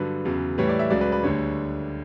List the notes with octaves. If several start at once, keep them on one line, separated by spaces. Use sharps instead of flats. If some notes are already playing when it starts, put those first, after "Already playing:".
Already playing: G2 D3 F#3 B4
E2 C#3 F#3
A2 E3 G3 C#5
D5
E5
C#2 C#3 F#3 D5
B4
B4
D2 D3 G3 C#5